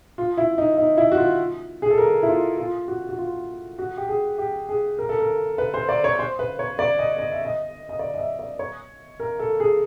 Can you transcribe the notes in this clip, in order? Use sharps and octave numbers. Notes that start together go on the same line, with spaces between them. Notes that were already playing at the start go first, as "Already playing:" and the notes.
F4
E4
D#4
D#4
E4
F#4
F4
G#4
A4
A#4
E4
F4
F4
F#4
F#4
F4
F#4
G4
G#4
G4
G#4
A#4
A4
A#4
B4
C5
D5
C#5
C5
B4
C#5
D5
D#5
D#5
E5
D#5
D#5
D5
D#5
E5
D5
C#5
A#4
A4
G#4